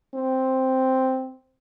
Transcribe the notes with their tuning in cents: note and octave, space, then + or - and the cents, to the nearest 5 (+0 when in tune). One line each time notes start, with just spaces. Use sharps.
C4 +0